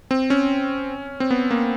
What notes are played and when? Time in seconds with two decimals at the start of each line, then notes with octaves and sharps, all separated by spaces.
0.11 C4
0.30 C#4
1.20 C4
1.31 B3
1.51 A#3